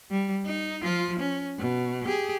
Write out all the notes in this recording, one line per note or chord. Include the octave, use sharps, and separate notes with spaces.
G3
D#4
F3 F4
C#4
B2
G4 G#4